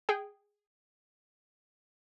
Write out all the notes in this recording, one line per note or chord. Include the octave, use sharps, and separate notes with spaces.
G#4 G5